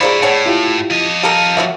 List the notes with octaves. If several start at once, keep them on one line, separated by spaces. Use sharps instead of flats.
F3 G3 A#3 G#4 C#5 D5 E5 B5
A2 C#5 F#5 G#5
E4 F4 G4
F3 D#5
G4 A4 A#4 F5 A5
A#3 C#4 F#4 E5